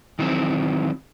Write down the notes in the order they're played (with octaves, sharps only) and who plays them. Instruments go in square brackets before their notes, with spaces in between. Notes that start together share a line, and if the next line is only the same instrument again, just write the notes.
[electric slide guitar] D#3 E3 F#3 C4